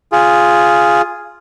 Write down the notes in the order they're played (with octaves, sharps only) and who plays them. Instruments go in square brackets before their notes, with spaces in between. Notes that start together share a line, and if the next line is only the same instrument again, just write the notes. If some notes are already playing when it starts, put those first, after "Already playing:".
[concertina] F4 G#4